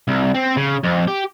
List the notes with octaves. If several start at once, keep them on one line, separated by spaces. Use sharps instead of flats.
C2
C4
C#3
F2
G4